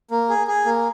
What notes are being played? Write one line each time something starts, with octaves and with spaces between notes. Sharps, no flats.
A#3
G#4
G#4
A#3